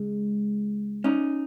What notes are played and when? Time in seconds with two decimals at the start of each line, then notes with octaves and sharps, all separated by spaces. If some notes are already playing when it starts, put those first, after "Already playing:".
Already playing: C#2 G#3
1.04 C#4 D#4